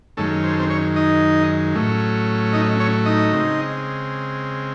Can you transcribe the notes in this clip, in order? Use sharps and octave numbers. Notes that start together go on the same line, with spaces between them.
F#2 D#3 G#3 A3 C#4 A4
C5
A4
C4 C5
C#4 C#5
D#4 D#5
A2 F#3 A3 C#4
D#4 D#5
C#4 C#5
D#4 D#5
C#3 G#3 C4